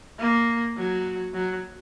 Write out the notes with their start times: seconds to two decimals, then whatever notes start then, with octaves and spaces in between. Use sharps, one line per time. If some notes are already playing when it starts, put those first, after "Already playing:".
0.19 A#3
0.77 F#3
1.34 F#3